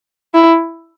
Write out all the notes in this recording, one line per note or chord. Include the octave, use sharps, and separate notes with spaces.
E4